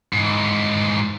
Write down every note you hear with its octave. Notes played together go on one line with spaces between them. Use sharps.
G#2 E3